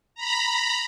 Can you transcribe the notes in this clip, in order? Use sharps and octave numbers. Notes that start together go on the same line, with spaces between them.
A#5 B5